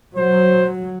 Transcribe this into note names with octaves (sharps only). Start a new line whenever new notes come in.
F#3 C5